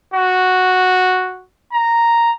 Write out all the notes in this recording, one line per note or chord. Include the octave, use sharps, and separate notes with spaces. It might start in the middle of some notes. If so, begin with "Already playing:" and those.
F#4
A#5